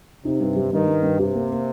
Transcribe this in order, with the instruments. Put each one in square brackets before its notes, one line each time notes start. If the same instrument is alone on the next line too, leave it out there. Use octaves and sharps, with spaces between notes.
[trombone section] C3 [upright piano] D#4
[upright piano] G2
G3
[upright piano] G2 [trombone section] D#3
[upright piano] G2
G2
[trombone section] C3 [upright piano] G4
[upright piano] A#3
A#3